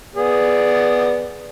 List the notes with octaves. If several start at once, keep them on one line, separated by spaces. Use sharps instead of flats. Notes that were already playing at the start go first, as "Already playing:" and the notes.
B3 G#4 D5